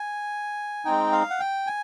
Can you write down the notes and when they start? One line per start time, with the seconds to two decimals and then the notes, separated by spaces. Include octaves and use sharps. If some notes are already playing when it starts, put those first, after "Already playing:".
Already playing: G#5
0.85 G#3 C4 D#4 G5
1.12 F5
1.30 F#5
1.40 G5
1.67 G#5